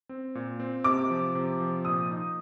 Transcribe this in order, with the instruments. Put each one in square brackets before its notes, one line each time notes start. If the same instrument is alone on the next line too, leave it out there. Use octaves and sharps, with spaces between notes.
[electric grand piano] C4
A#2
C4
[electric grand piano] C3 [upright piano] D6
[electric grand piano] F3
C3
F3
[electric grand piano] A#2 [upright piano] D#6
[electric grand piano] D#4